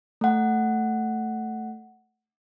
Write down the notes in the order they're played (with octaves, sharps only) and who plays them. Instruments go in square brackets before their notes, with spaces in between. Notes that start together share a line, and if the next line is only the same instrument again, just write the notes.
[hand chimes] A3 F#5